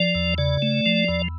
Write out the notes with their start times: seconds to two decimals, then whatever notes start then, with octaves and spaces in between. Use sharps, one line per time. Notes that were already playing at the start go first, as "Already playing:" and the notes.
Already playing: F3 D5
0.15 E2
0.38 C#3 D5
0.62 A3
0.86 F3
1.08 E2